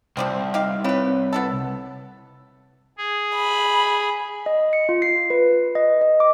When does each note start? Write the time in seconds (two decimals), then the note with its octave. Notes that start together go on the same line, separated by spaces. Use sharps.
0.17 C2 F3 G3 C4
0.54 D#4 G4 F5
0.84 C4 E4 B4 C#5 B5
1.33 B3 E4 A4
2.98 G#4
3.35 B5
4.46 D#5
4.73 C#7
4.89 F4
5.02 C7
5.30 B4
5.75 D#5
6.01 D#5
6.20 D6